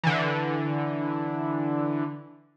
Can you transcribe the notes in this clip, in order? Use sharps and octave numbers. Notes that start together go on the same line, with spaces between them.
D3 E3